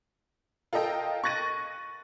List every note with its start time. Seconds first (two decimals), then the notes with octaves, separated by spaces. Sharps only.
0.73 F4 A4 A#4 D#5 G5
1.24 C#6 F#6 A6 A#6 D#7